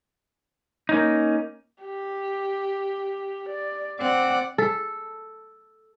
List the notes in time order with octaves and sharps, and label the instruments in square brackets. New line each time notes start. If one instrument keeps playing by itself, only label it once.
[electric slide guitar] A#3 C#4 D#4
[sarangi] G4
D5
[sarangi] C4 [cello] D5 F#5
[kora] A4